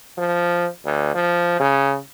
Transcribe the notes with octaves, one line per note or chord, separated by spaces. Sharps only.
F3
D2
F3
C#3